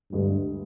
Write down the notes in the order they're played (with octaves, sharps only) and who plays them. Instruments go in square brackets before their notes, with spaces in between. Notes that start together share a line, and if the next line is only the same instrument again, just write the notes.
[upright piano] D2 D3 G#3 [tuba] G2